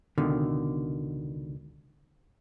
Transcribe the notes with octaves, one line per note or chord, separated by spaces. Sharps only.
C#2 B2 D3 D#3